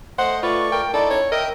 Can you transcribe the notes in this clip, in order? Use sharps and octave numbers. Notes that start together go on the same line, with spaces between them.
A3 C5 D#5 F#5
A3 F4 B4 D5 C#6
A#4 G5
D#4 E4 A4 D5
C#5
A#4 D#5 E5 G5